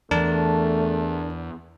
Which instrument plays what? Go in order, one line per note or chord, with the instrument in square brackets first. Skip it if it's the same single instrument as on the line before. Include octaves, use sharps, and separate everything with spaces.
[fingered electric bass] E2 E3 [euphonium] A3 [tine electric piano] D4 A#4 A5